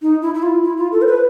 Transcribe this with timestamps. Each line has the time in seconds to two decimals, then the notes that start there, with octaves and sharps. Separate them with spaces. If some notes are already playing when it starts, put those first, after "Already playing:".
0.02 D#4
0.22 E4
0.34 E4
0.43 F4
0.62 E4
0.77 F4
0.92 A4
1.02 C5
1.07 B4